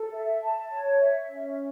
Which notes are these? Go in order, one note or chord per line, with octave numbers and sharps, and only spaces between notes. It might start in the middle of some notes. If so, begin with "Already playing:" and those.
Already playing: A4
E5
A5
C#5
E5
C#4